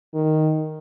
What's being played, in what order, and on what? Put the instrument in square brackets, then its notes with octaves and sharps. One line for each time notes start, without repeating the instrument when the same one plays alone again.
[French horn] D#3